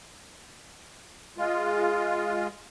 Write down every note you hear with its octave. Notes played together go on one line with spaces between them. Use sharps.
G#3 F4